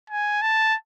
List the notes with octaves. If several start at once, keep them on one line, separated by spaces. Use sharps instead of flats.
G#5
A5